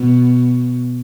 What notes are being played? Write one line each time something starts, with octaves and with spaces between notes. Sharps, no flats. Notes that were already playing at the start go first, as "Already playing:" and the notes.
Already playing: B2